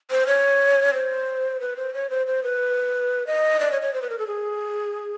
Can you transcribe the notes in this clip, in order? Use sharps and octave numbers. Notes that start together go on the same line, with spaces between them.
C5
C#5
C5
B4
C5
C#5
C5
C5
B4
D#5
D5
C#5
C#5
C5
B4
A#4
A4
G#4